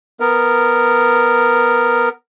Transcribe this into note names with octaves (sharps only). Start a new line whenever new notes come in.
B3 A#4